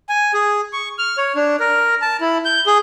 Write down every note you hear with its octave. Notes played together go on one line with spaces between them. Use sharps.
G#5
G#4
C#6
F6
C#5
D4
A#4
A5
E4
G6
G#4